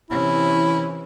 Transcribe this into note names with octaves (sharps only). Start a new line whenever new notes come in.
C3 E3 C#4 E4